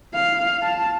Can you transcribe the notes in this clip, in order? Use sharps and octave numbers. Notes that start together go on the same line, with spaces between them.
F5
A5